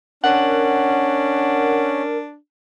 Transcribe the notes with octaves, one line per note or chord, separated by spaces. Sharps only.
C#4 D4 A#4 F#5